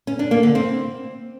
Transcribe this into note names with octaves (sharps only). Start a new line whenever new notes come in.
C#4
D4
A#3
D3
C4